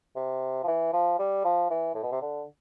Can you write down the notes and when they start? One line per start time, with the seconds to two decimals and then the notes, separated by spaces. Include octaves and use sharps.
0.16 C3
0.63 F3
0.67 E3
0.93 F3
1.19 G3
1.44 F3
1.70 E3
1.95 A2
2.03 B2
2.12 C3
2.22 D3